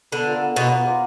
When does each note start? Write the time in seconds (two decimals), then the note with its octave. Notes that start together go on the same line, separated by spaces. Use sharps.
0.12 D3 B3
0.27 F4 A#4 D5
0.41 B3
0.56 B2 F4 A#4 D5
0.70 B3
0.85 F4 A#4 D5